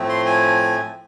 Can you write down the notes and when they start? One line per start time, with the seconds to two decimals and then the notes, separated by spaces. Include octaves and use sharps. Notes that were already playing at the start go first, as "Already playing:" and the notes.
Already playing: A2 F3 A3 C4
0.09 C6
0.26 G#5